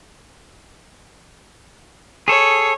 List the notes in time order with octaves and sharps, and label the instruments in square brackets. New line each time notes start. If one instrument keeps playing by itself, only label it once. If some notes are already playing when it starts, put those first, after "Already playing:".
[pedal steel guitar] G#4 A4 [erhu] C#5